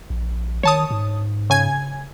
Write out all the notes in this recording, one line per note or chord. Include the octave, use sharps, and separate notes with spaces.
A#1
D#3 C#5 A5 D#6
G#2
C#3 G#5 G#6